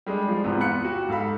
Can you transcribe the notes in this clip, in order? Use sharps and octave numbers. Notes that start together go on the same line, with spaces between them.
G3 G#3 D4
F3
E2 G#2 C3 B3 C4
F4 B5 F#6 C#7
F#4 G4
G#2 A4 F5 B5